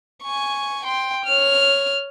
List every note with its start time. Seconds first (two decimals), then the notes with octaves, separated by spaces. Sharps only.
0.23 G#5 C#6
0.85 G5 C6
1.25 C#5 F6